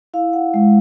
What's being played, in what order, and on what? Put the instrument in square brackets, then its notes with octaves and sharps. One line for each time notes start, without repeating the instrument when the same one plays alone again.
[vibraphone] E4 F5
F#5
G#3 F5